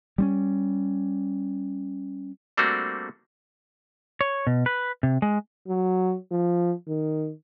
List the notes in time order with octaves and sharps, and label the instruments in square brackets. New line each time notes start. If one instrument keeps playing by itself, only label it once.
[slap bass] G3 C4 C#4
[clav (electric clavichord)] G3 A3 A#3 C4 D4 F#4
[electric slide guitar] C#5
B2
B4
C3
G#3
[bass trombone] F#3
F3
D#3